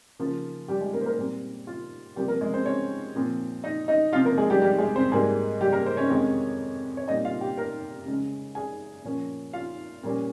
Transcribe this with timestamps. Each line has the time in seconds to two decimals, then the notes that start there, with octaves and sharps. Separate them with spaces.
0.20 C#3 F3 A#3 F4
0.68 G3 G4
0.81 G#3 G#4
0.93 A#3 A#4
1.01 C5
1.06 A#3 A#4
1.18 A#2 G3 C4
1.67 F4
2.16 C3 F3 G3 A#3 G4
2.28 A#3 A#4
2.41 G#3 G#4
2.54 C4 C5
2.65 C#4 C#5
3.15 A#2 F3 C4
3.64 D#4 D#5
3.88 D#4 D#5
4.13 C3 F3 C4 F4 F5
4.25 A#3 A#4
4.38 G#3 G#4
4.50 G3 G4
4.62 G3 G4
4.78 G#3 G#4
4.96 C4 C5
5.12 G#2 G3 G#3 A#3 G#4
5.61 G3 G4
5.72 A#3 A#4
5.86 C5
5.97 C#4 C#5
6.10 F2 C3 D#3 G#3
6.97 C#5
7.08 A#2 G3 C4 D#4 D#5
7.25 F4 F5
7.41 G4 G5
7.57 A#4 A#5
8.06 C#3 G#3 C#4
8.55 G#4 G#5
9.04 A#2 F3 A#3 C#4
9.53 F4 F5
10.03 A#2 G3 A#3 C#4